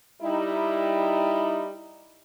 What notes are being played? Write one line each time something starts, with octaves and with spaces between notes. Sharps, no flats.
G3 D#4 E4